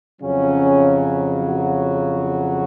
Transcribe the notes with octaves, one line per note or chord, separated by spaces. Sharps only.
F2 C#3 F#3 C#4
F#4